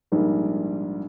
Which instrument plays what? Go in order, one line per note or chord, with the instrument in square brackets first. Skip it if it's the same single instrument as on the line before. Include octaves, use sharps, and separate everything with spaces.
[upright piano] A#1 G#2 G3 A#4